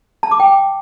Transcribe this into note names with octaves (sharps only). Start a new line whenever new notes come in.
A5
D6
G5